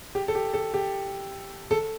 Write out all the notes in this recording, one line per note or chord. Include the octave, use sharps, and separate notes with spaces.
G4
A4
G4
A4
G4
A4